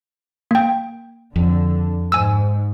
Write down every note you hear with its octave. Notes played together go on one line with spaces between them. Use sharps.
A#3 G5
F2 D3
G#2 G#5 E6